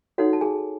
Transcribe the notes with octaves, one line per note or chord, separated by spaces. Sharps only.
D#4 F#4 A4 C#5 F#5
A5
G#4 G#5